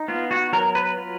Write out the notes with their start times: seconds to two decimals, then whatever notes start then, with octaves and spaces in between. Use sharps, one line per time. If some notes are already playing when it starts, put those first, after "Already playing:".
Already playing: D#4
0.08 B3 F4
0.31 F#4
0.53 F#3 A#4
0.75 B4
0.97 F4